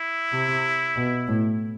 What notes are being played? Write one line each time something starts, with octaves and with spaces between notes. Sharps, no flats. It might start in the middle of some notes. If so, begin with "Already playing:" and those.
Already playing: E4
C3
B2
A2